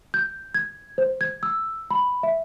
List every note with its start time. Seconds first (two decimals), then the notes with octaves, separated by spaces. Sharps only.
0.14 G6
0.54 G#6
0.98 C5
1.21 G#6
1.43 E6
1.91 B5
2.23 E5